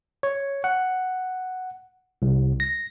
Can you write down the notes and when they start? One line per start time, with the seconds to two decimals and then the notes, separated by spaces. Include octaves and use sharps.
0.23 C#5
0.64 F#5
2.22 C2
2.60 A#6